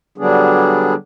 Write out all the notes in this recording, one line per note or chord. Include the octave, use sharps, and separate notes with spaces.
D3 F#3 G3 B3 D4 G#4